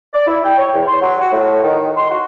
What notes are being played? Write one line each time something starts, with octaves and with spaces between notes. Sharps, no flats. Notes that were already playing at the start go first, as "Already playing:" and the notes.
D5
E4
G5
C#5
E2
C6
F#3
F#4
A2
D#3
C6
F#4